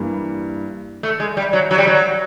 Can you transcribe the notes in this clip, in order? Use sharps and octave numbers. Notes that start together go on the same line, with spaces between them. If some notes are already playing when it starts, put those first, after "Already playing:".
Already playing: G2 E3 G3 A#3
A3
G#3
G3
F#3
F#3
G3
F#3